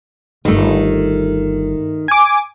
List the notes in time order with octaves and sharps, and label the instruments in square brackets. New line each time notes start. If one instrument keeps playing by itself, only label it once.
[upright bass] D1 G1 [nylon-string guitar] D#3 A3
[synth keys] G#5 D6